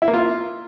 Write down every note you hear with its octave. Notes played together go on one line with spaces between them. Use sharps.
E4
A#3
F4